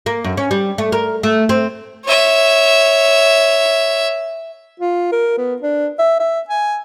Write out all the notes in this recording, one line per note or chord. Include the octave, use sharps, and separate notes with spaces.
A#3
F#2
C#4
G3
A3
A#4
A3
C4
C#5 E5
F4
A#4
B3
D4
E5
E5
G#5